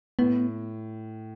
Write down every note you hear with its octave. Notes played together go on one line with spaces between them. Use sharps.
A2 B3